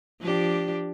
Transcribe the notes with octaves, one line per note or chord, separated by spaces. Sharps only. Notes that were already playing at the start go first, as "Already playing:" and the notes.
F3 D4 G4